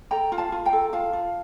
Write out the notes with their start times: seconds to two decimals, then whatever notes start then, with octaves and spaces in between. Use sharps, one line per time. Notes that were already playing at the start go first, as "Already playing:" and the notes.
0.11 A4 G5 A#5
0.32 F4
0.38 F5 A5
0.52 F4
0.65 G5 A#5
0.73 A4
0.93 F4 F5 A5
1.13 F4